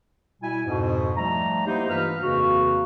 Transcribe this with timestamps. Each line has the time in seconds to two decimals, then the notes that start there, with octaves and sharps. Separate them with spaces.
0.42 B2 G3 E4 G#5
0.67 F2 G#2 B2
1.17 F3 G3 A3 A#5
1.67 A#3 B3 D#4 E4 G4 C5
1.89 G2 E3 D#4 F4 B4 F6
2.22 F2 C#3 E3 A#3 F#4